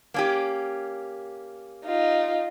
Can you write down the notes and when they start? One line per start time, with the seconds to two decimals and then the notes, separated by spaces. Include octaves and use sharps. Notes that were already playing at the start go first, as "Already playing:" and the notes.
0.14 A#3 C#4 G4
1.85 D#4 F4